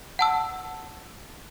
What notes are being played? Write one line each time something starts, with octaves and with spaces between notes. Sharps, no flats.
F#5 A5 E6